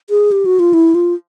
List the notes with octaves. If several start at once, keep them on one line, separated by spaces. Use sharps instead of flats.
G#4
G4
F#4
F4
E4
F4